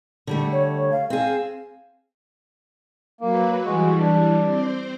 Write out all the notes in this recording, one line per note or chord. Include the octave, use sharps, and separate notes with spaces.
D3 G3 A3
C#5
F5
C4 G#4 F5
F#3 A#3 B4
E3 G3 G#3 F#4
D4
C4 C5